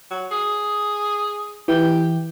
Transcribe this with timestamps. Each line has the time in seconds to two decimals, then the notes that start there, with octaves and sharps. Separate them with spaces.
0.10 F#3
0.31 G#4
1.68 E3 G4